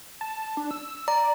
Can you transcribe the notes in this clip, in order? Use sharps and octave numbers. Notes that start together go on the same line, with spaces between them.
A5
D4
E6
D5 A#5